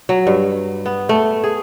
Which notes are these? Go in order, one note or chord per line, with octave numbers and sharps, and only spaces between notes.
F#3
G2
B3
A3
G#4